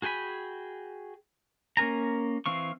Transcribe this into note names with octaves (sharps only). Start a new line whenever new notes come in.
F#4 G#4 G5 G#5 B5
A#3 C#4 A#4 G#5 A#5
E3 C4 F5 C#6